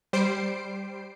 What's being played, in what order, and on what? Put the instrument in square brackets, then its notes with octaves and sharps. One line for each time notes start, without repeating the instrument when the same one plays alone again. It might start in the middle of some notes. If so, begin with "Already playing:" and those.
[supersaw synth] G3 C5 C7 D7